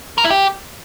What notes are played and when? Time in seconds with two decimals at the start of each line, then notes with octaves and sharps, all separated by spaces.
0.18 A#4
0.24 E4
0.30 G4